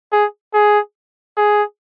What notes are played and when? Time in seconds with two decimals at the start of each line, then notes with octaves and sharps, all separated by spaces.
0.12 G#4
0.54 G#4
1.37 G#4